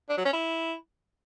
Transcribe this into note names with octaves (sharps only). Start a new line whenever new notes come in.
D4
F#3
C#4
E4